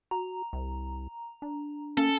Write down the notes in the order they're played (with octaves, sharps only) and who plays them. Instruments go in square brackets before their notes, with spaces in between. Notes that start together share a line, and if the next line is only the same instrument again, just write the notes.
[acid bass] F#4 [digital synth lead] A#5
[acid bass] C2
D4
[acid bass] A#3 [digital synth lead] C#4 [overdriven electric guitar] A4